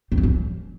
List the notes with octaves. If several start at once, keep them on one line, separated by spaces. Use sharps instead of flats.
C4
F3
C#4